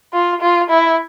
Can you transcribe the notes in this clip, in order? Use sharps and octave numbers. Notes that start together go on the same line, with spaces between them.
F4
F4
E4